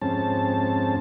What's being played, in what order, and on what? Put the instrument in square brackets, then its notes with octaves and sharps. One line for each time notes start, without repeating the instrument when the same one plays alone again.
[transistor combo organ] F2 G#2 C4 C#4 A5